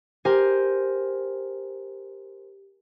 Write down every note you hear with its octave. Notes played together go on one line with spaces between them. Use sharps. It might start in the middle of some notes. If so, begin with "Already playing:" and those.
G4 A#4 C5 G#5